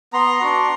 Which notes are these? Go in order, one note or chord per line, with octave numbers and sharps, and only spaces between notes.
B3 A#5 C6
D4 F#4